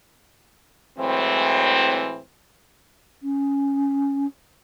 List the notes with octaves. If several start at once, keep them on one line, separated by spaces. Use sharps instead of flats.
A2 E3 F#3 G#3 C4
C#4